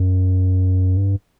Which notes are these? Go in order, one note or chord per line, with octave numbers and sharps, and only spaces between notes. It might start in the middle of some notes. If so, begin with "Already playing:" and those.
Already playing: F#2
G2